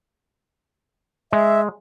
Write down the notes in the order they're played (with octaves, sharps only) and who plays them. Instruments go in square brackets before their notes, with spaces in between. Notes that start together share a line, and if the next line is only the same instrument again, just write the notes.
[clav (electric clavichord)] G#3 [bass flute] E5